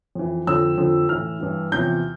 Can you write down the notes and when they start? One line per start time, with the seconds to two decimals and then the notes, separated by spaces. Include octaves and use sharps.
0.15 F2 E3
0.47 F2 D3 F3 E6
0.78 F2 D3 F3
1.09 A2 E3 F6
1.41 G2 E3
1.72 E2 C3 F3 G6